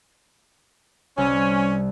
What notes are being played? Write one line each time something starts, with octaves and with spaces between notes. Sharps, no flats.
C2 C#4